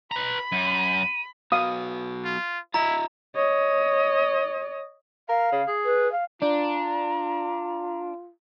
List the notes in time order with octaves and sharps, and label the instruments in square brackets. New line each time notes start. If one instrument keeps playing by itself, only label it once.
[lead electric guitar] B4 A#5 [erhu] B5
[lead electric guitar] F#2 [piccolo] D#7
[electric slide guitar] F#3 B3 F#4 [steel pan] F5 D#6
[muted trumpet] F4
[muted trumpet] E4 [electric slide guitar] F4 D#5 E5 [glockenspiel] A#5
[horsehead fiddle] C#5 D#5
[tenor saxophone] A#4 [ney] F5
[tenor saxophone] C#3
G#4
[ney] B4
F5
[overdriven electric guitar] D4 [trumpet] F4 [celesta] D5 [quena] A#5